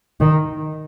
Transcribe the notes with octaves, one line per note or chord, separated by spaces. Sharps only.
D#3